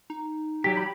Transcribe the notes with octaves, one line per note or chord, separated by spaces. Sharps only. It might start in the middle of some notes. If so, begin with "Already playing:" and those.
D#4
F#3 G4 B6
B5